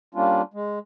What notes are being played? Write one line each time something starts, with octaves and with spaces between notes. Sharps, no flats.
G3 A#3 C#4 D4 F4
G#3